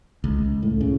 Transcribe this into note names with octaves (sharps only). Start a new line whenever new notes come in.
C#2
A2
C#3